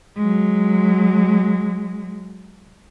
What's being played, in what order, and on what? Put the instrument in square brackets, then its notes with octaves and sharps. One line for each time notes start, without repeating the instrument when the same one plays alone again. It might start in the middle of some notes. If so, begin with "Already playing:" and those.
[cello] F#3 G#3